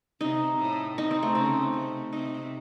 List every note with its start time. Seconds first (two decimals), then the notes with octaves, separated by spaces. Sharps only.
0.21 C3 D#4
0.59 A2
0.97 C3 D#4
1.11 C4
1.23 A3
1.35 C#3 C4
1.74 C3
2.13 C3 D#4